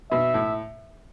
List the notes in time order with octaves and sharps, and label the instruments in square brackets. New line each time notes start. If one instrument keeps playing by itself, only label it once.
[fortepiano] B2 [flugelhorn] E5
[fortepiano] A2